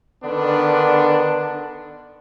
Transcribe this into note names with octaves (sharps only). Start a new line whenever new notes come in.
D3 D#3 B3 D4